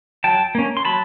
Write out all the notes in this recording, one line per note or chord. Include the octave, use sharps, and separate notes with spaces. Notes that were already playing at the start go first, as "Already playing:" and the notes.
F#3 G5 A5
A#3 C#4
C6
F#3 A5 B5